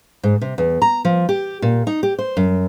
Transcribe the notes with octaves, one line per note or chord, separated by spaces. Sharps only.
G#2
C3
E2
A#5
F3
G4
A#2
D#4
G4
C5
F#2